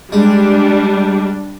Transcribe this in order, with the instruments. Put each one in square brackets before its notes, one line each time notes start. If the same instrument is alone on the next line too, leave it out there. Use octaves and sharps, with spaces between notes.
[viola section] G3 D4 [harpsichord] G#3